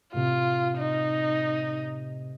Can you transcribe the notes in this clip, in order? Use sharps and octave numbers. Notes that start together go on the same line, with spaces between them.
A2 C3 F4
D#4